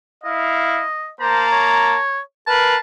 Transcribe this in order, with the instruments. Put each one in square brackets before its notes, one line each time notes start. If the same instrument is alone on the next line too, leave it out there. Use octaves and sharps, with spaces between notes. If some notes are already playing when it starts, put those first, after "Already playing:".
[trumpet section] E4 F5 [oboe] D#5
[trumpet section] A#3 A5 A#5 [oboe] C5
[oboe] C#5
[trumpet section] A#4 B4 F5 [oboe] A5